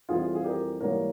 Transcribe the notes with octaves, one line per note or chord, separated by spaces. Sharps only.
F2 E3 G3 F4 G#4
G#4
G4 A#4
G#2 E3 G3 A#3 A#4 C#5